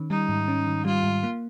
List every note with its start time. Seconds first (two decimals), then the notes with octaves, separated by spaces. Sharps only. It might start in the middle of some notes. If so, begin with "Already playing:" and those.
Already playing: D#3 C#4
0.10 G3 D#4
0.29 G#2
0.48 C#4
0.67 D#3
0.85 G3 F4
1.03 G#2
1.23 A#3